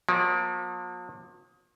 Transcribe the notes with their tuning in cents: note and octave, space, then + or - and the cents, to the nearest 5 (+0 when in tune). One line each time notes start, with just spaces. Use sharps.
F3 +45 A#3 +40